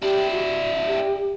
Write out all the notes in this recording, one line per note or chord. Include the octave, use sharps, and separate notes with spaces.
D4 E4 G4
F#4
G4